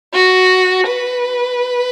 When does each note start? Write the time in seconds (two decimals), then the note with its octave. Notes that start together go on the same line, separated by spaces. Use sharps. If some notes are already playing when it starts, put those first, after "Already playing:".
0.14 F#4
0.88 B4